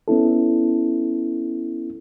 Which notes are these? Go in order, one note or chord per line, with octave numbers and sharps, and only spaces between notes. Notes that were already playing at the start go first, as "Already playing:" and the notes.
B3 C#4 E4 A4